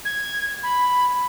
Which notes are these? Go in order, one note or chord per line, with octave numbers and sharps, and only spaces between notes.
G#6
B5